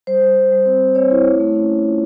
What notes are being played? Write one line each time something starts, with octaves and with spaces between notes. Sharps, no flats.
G3 C5
G3
G3
G3
C4
C4
C4 C#5
E4
A3
A3
C#4
C#4
F4